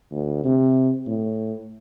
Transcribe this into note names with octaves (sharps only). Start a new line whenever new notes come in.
D2
C3
A2